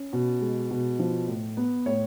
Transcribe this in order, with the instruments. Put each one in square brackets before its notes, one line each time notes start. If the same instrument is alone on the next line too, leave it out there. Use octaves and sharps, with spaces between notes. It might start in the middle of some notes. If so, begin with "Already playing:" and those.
Already playing: [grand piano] C#4
B2
G#3
B2
F3
A2
B3
A2 C#5